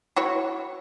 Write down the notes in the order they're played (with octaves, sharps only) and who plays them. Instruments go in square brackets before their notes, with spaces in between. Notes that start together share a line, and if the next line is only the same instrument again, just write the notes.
[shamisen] E4 F#4 C#5